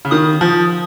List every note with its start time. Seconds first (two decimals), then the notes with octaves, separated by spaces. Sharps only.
0.05 C#3
0.11 D#3 D#6
0.41 F3